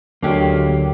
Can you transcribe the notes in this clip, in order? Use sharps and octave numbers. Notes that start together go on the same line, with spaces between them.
D2 D3 F#3 A#3 G4